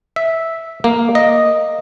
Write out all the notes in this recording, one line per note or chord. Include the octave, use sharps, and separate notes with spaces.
E5
A#3
D#5